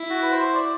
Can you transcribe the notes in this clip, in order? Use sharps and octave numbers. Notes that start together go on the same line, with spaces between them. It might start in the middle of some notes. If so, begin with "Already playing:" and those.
Already playing: E4
F#4
B4
C5
D5